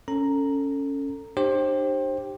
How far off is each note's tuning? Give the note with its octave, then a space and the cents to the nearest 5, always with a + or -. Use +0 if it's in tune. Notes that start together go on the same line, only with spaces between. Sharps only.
C#4 +0 A4 +20 A#5 +0
D4 +45 G4 +0 C5 +25